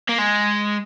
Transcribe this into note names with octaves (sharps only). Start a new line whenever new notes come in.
A#3
G#3